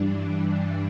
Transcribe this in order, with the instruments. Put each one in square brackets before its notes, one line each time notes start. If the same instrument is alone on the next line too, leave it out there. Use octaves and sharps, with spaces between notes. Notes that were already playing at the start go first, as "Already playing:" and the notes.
Already playing: [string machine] G2 E3 G3 D4
D4